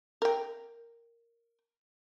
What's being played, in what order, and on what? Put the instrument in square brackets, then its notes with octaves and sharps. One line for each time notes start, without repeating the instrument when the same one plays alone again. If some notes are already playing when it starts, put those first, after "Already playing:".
[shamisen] A#4 G5